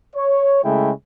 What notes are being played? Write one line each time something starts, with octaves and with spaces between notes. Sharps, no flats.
C#5
C#3 G#3 A3 E4 G5